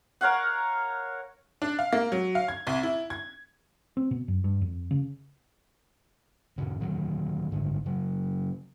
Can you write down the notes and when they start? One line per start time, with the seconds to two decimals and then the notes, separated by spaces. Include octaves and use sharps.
0.21 A#4 C#5 F5 F#5
1.62 D4
1.79 F5
1.93 A#3
2.12 F#3
2.35 F5
2.48 G#6
2.67 C2
2.83 E4
3.10 G#6
3.97 C4
4.11 B2
4.28 F#2
4.44 G2
4.61 F2
4.91 C#3
6.58 A#2 C#3
6.80 A#2 D#3 F#3
7.52 G#1 D3
7.86 C#3 F#3